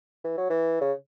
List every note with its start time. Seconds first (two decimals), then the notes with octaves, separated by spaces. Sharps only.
0.25 E3
0.38 F#3
0.50 E3
0.81 C#3